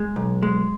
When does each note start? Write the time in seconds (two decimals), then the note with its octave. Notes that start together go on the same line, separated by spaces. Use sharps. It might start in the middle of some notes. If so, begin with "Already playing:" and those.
Already playing: G#3
0.16 B1
0.43 G#3